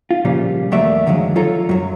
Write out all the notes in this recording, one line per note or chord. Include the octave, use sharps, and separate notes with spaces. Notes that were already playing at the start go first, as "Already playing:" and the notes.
F4
A#2 C#3 F3 G3
D#2 F#3 A3 A#3 D5 E5
F#2 D3 D#3 F3 F#3 G#3
F4 A4 C#5 A#5
F#2 F#3